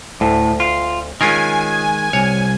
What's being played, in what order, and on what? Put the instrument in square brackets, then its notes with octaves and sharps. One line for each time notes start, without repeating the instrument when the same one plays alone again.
[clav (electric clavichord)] D2 [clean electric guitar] A2
[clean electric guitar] F4
[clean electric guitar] D#3 G#3 [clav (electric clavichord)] C#4 F4 A#4 [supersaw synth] G#5
[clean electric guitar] C2 [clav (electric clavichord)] C#5